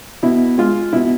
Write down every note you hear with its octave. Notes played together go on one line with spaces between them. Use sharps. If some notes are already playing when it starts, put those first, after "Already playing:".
B2 E4
G#3 F4
B2 E4